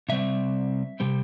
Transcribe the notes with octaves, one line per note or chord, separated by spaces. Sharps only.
C3 G3 C4 E5
C3 G3 C4